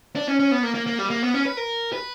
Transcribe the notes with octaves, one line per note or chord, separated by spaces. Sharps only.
D4
C#4
C#4
B3
A#3
A#3
A#3
G3
A#3
B3
C#4
B4
A#4
B4